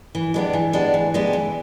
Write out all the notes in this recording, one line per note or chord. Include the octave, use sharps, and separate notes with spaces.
E3
G#3 B3 D4 G4
E3
G#3 B3 D4 G4
E3
G#3 B3 D4 G4
E3